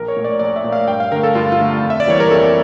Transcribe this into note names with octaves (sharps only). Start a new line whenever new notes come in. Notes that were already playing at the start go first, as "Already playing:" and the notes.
Already playing: A#1 A#4
C#5
A#2 A3
D5
A#1 D5
E5
A#2 A3
F5
G2 G5
F5
D3 A3 A#4
A4
G2 F4
F4
D3 A3
F2
E5
D5
E3 G3 A#3 C#5
A#4
F2 A4